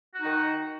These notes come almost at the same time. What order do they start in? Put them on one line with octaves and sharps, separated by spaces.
F#4 D#4 D#3